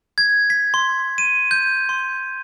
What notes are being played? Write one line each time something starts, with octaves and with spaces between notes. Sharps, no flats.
G#6
B6
C6
D#7
G6
C6